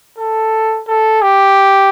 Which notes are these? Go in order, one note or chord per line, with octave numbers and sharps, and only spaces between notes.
A4
A4
G4